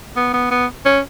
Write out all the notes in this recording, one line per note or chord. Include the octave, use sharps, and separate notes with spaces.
B3
B3
B3
C#4